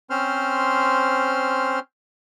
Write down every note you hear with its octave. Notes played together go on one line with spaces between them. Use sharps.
C4 C#4 C5 C6 F6